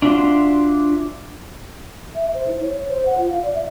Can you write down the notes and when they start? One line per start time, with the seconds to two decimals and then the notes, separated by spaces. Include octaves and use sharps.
0.02 D4 F4 F#4 E5 C6
2.15 E5
2.34 C5
2.48 E4
2.61 C#5
2.75 C#5
2.89 C5
3.05 F#5
3.17 F4
3.30 F5
3.43 D5
3.54 E5